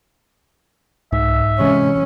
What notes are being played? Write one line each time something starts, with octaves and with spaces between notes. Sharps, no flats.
C2 G#2 E5
C3 E3 G#3 C#4